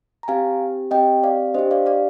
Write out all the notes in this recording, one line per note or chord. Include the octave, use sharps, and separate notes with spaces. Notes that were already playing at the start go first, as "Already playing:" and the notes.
A#5
C4 G4 F5 G#5
C4 G4 D#5 G5
D5 F5
D4 G4 C5 D#5
D5 F5
D5 F5